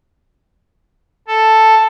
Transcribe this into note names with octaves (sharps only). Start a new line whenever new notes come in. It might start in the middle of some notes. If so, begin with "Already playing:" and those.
A4